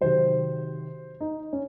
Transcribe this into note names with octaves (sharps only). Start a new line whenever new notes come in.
C3 D#3 F#3 C5
D#4
C#4